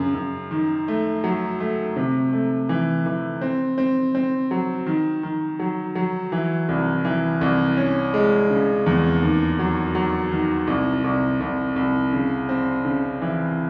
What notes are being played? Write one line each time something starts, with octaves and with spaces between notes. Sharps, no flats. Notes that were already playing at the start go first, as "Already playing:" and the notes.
Already playing: F#2 C#3
F#2
D#3
A3
F#3
A3
C3
A3
E3
E3
C4
C4
C4
F#3
D#3
D#3
F#3
F#3
E3
C2
E3
C2
C#4
G#3
C#3
E2
D#2
F#3
F#3
D#3
C2
C2
C2
C2
C#3
C4
C#3
E3